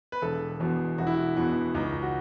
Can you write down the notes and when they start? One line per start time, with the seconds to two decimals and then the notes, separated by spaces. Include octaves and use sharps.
0.12 B4
0.22 E1 A4
0.60 E2 B2
0.98 E1 F#4
1.07 E4
1.14 F#4
1.36 E2 B2 E4
1.74 C#2 D#4
2.02 F#4